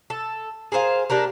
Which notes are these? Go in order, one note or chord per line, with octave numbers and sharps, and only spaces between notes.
A4
G#4 A#4 C5 F5
A#3 D4 G4 A#4